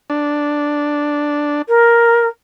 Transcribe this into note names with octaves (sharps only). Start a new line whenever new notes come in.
D4
A#4